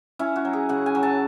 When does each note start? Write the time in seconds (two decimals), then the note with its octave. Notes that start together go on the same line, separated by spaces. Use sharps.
0.19 C#4 E4
0.36 F#4
0.45 F#3
0.53 G#4
0.69 C#3 F#5
0.86 G#5
0.95 F#3
1.03 A5